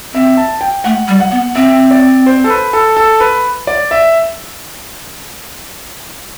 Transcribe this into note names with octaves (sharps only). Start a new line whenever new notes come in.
C4 E5
A5
G5
A3 F#5
G3
F#5
B3
C4 E5
D5
C5
A4
B4
A4
A4
B4
D5
E5